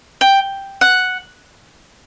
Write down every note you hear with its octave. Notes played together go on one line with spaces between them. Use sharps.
G5
F#5